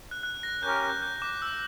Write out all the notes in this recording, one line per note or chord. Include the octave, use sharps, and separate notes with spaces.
F#6
F#6
A#6
C#4 G4 A#4 G6
G6
G6
D6
E6